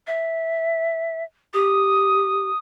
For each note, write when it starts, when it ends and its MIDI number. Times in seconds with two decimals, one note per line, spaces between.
0.07 1.24 76
1.54 2.49 67
1.54 2.58 87